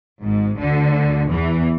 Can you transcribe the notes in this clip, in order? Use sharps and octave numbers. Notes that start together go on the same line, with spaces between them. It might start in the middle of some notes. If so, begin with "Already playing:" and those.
G#1 G#2
D2 D3
E2 E3